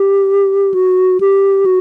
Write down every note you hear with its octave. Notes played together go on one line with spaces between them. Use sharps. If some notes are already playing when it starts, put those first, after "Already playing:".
Already playing: G4
F#4
G4
F#4